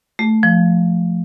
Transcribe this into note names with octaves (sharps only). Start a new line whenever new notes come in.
A3
F3